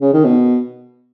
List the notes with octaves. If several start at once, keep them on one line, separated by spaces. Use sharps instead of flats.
C#3
D#3
B2